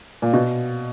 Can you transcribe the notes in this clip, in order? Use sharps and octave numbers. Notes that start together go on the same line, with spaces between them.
A#2
B2